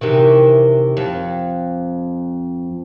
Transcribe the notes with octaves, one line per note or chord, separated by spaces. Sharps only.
C3 D#3 E3
F2